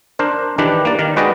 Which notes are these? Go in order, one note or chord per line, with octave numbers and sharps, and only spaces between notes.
D4 A#4 C5
D#3 E3 D4 G4 B4
A#3 D5
D#3 A#4
G#3 F#4 B4 D5 D#5 G5